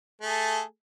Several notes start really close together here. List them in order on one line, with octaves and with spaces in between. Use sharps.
A3 G#4 A4